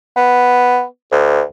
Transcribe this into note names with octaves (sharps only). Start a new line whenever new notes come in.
B3
D2